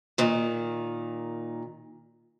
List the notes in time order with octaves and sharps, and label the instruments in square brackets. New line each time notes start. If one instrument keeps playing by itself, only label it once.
[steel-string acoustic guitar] A#2 D#3